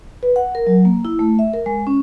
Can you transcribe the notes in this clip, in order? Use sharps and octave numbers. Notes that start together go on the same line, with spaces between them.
B4
F#5
A#4
F#3
A#3
E4
A3
E5
A#4
G#3
C#4